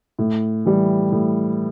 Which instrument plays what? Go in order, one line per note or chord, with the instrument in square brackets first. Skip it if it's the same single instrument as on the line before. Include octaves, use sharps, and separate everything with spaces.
[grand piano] A2
E3 G3
A2